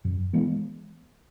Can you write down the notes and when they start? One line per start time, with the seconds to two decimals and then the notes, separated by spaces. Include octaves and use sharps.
0.05 F#2
0.33 E3 G#3 B3